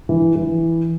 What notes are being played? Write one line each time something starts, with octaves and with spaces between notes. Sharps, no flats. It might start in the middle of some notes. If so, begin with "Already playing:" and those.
E3
E3